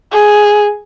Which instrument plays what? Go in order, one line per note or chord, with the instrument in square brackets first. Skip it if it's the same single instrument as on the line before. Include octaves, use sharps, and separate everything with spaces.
[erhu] G#4